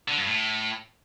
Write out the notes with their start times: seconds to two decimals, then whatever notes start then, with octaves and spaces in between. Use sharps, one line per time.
0.08 D3
0.17 G2
0.27 A2